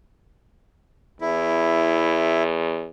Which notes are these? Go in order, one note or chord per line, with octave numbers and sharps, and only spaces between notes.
E2 E4